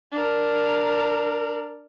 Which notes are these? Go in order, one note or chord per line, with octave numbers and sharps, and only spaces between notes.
D4 A#4